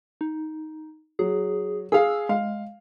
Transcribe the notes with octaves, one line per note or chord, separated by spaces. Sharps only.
D#4
F#3 G#4
G#4 F5 E6
G#3 F5